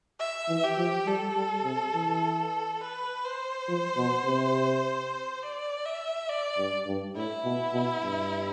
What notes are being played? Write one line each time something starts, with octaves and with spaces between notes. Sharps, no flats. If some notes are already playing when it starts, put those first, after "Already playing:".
E5
E3
G4
F3
G3 A4
G3
C3
E3
B4
C5
F3
B2
C3
D5
E5
D5
G2
G2
A2 E4
B2
B2
G2